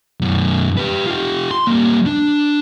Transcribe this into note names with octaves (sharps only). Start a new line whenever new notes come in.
F#2 B2
G4 B4
F4 G4
C6
G3 A#3
D4